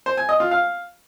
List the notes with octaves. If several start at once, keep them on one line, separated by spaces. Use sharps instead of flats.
C5
G#5
D#5
F4
F5